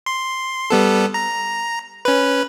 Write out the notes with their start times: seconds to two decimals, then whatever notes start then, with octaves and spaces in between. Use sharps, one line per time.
0.06 C6
0.70 G3 B3 A4
1.14 A#5
2.05 C#4 B4